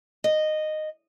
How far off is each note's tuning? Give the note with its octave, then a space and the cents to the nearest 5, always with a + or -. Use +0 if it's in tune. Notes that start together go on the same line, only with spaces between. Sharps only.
D#5 -10